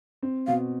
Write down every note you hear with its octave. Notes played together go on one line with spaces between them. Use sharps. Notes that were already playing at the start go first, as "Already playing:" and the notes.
C4
B2 F5